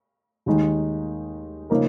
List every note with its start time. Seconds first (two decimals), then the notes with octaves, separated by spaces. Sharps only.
0.46 D#2 D#3 G#3 D#4
1.70 C#3 F3 A#3 D#4 A#4